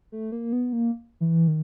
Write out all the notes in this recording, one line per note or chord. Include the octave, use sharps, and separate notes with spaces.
A3
A#3
B3
A#3
E3
D#3